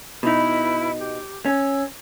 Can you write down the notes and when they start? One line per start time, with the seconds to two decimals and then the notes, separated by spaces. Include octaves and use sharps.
0.23 B2 D#4 E4 B4 B5
0.98 G4
1.46 C#4 E6